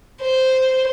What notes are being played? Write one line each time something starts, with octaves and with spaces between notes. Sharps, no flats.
C5